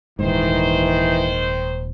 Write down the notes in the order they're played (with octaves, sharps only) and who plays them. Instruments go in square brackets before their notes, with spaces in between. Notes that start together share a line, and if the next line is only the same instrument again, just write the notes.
[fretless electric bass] D#1 D#2 G#2 [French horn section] D#3 C5 [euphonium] E3